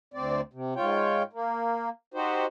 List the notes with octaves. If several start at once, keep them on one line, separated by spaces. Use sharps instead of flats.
D2 C4 D5
C3
G#2 F4 C#5 G5
A#3
D#4 F#4 G4 C5